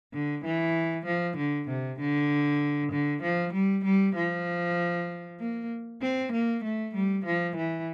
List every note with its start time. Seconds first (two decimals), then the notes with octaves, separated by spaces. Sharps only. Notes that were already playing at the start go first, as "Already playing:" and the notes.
0.13 D3
0.45 E3
1.06 F3
1.37 D3
1.68 C3
1.99 D3
2.92 D3
3.23 F3
3.53 G3
3.85 G3
4.16 F3
5.40 A#3
6.02 C4
6.32 A#3
6.64 A3
6.94 G3
7.25 F3
7.56 E3